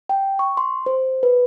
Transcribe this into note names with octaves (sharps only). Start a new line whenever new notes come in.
G5
C#6
C6
C5
B4